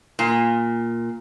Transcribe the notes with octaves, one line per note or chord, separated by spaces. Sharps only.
A#2